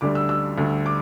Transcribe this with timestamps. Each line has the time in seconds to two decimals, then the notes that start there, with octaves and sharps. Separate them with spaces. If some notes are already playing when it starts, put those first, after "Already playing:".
0.01 D2 D3 G3 D6
0.15 E6
0.29 E6
0.58 D2 D3 G3
0.86 D6